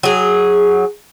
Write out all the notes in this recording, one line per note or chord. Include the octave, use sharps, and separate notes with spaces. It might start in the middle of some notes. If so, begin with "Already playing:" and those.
F#3 G#4